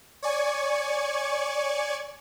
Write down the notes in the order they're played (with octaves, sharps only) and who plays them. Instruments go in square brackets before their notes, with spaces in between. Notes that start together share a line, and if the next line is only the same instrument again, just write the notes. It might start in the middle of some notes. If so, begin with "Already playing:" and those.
[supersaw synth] C#5 D5 G#5 C#6